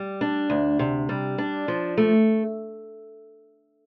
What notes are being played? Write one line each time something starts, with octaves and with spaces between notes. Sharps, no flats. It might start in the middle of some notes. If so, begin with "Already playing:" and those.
Already playing: G3
D4
D2
C3
G3
D4
F3
A3